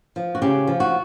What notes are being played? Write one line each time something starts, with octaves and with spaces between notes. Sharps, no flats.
F3
F#4
C#3 G4
F3
F#4